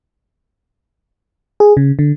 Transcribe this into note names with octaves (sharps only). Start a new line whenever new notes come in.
G#4
C#3
D3